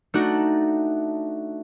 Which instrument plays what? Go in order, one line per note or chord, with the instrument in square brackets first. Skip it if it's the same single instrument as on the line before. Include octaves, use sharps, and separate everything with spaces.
[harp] A3 D4 D#4 F#4